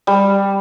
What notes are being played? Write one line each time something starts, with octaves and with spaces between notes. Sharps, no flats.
G3